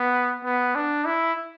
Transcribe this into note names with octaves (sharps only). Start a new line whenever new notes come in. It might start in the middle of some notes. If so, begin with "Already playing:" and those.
Already playing: B3
B3
D4
E4